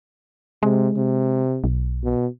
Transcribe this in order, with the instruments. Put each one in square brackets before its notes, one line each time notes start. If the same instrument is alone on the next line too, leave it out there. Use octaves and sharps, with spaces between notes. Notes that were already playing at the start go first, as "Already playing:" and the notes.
[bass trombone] C3 [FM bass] G#3
[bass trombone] C3
[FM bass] B1
[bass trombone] B2